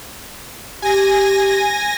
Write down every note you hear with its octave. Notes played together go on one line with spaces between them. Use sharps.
G4 G#5 A#6